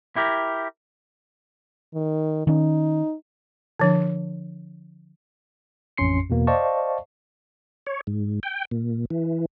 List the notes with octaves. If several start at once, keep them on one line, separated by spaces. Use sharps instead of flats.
E4 G4 A#4
D#3
D#3 C#4 D#4
D3 F3 D4
A1 F2 C#4 C6 C7 C#7
E2 B2 A#3
C5 D5 D#5 F5 A5 C#6
C#5
G#2
G5
A#2
E3